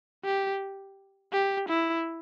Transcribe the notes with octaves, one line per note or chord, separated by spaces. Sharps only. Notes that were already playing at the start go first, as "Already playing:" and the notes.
G4
G4
E4